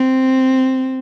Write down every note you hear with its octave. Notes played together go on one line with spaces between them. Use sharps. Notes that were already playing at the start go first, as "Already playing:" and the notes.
Already playing: C4